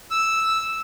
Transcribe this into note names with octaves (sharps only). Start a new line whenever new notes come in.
E6